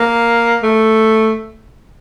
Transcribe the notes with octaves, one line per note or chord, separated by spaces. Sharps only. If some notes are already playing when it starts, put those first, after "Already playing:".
Already playing: A#3
A3